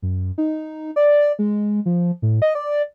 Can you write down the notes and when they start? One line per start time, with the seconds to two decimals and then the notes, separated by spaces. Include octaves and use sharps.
0.02 F#2
0.38 D#4
0.96 D5
1.39 G#3
1.86 F3
2.22 A2
2.42 D#5
2.55 D5